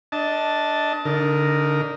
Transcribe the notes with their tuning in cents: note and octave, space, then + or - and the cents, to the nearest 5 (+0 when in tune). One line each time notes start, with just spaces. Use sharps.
D4 +0 D#5 +30 A5 +0
D3 -25 D#4 +0 A#4 +0